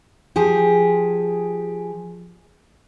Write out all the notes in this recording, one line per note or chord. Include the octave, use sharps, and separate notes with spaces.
F3 G4 G#4